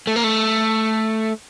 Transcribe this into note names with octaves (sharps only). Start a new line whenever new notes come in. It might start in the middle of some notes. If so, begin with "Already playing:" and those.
A3
A#3
A3